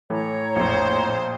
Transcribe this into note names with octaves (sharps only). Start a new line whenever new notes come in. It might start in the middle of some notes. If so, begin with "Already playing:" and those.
A2 E3 C#5 A#5
A#1 F2 C5